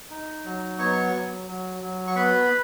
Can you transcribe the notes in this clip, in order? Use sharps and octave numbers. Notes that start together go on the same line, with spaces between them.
D#4
F#3
B3 C#5 C#6
F#3
F#3
F#3
C#6
B3 B4 B5